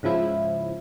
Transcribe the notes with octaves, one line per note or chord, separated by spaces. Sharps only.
G#2 C#3 F3 E4